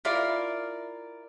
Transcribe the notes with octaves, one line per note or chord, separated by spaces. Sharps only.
E4 F4 A#4 D5